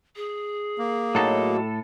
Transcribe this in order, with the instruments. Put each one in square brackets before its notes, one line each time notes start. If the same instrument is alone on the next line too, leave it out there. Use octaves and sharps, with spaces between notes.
[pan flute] G#4
[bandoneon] A#3
[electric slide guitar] A2 A4 [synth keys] F#3 D#4